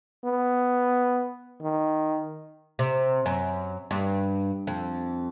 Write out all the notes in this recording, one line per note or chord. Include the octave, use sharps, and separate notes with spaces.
B3
D#3
C3
F#2
G2
F2